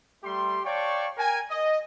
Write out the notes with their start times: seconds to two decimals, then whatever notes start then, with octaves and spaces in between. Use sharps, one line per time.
0.23 G3 A3 G4 C6
0.65 C#5 D5 F5 G5 A5 C#6
1.17 A#4 G5 G#5
1.50 D#5